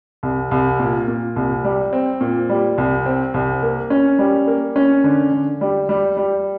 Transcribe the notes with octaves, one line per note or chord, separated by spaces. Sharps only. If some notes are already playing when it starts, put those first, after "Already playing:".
C2
C2
A#2
A#2
C2
G3
C4
A#2
G3
C2
C4
C2
A#3
C#4
G3
A#3
C#4
D3
D3
G3
G3
G3